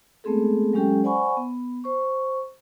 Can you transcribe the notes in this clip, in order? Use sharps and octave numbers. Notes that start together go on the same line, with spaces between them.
G#3 A3 B3 C4 G#4 A4
F#3 G#3 C#4 G4 A4 G5
C5 D5 F#5 G#5 B5 C#6
B3
C5 C#6